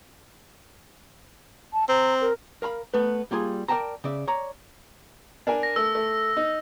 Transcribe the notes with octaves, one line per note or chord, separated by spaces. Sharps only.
A5
C4 A#5
A#4
A#4 F5 A#5 B5
A3 B3 B4
G3 A#3 F4 G#4
A#4 D5 F5 G5 A5 A#5
C#3 D5 E5
C#5 D5 A#5
D4 A#4 G#5
A#6
A3 E6
A3
D#4